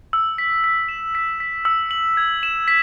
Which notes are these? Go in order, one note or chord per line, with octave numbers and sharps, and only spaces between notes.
E6
B6
B6
E7
B6
B6
E6
F#7
G#6
E7
B6